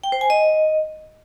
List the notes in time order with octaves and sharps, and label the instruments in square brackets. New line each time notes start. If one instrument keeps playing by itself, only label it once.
[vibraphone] G5
C5
G#5
D#5